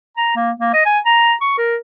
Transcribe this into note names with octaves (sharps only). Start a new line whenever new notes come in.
A#5
A#3
A#3
D#5
G#5
A#5
C#6
A#4